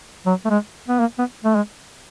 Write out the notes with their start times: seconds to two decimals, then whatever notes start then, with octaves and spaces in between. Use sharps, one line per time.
0.26 F#3
0.45 A3
0.50 G#3
0.88 B3
1.00 A#3
1.18 B3
1.44 A3
1.55 G#3